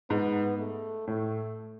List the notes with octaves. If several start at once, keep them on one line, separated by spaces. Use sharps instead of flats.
G#2 B3
A3
A2 A3